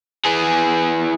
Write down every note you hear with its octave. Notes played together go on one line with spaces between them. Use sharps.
E3 G#4